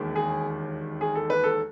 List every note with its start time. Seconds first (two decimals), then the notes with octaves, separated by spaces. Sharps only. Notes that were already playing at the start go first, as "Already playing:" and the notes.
Already playing: E1 D#2 D#3
0.16 G#4
1.01 G#4
1.15 A4
1.30 B4
1.44 A4